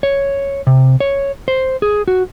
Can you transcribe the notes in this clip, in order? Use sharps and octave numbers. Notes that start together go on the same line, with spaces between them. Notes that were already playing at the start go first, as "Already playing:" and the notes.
C#5
C3
C#5
C5
G#4
F#4